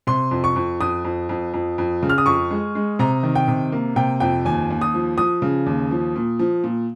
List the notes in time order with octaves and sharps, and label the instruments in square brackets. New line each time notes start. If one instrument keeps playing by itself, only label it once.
[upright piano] C3 C6
F2
C#6
F2
F2 D#6
F2
F2
F2
F2
C#3
F6
D#6
F2 C#6
G#3
G#3
C3 A#5
D#3
G5
C3
A#3
C3 G5
F2 G5
D#2 G#5
D#2
D#6
F3
F3 D#6
C#3
D#2
F3
A#2
F3
A#2